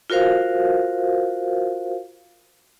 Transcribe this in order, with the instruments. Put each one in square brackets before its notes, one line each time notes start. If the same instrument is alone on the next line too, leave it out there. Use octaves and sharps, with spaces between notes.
[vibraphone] F4 F#4 A#4 C5 F5